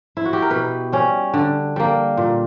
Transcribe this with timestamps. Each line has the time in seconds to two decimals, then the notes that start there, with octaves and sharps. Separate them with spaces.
0.17 E4
0.25 F#4
0.33 G4
0.42 A#4
0.50 B2 B4
0.92 G3 C#4
1.34 D3
1.76 G3 A#3
2.17 A#2